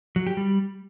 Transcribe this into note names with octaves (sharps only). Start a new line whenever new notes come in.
F#3
G4
G3